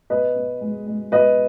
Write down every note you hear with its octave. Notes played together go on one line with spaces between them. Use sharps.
B2 B4 D#5
B2
G#3
G#3
B2 B4 D#5